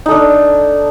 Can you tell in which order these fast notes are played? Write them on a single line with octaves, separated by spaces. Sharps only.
D#4 A4 D4